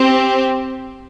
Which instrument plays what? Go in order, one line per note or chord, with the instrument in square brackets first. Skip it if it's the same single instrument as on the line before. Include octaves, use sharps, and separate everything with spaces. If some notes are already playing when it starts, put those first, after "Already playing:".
Already playing: [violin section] C4 G4